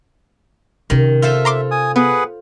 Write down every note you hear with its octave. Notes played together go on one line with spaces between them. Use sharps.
C3 D#3 C#4
F4 A4 C5 E5
A#5 C6 D6
G#5 D#6
B3 G#4 B4 F#5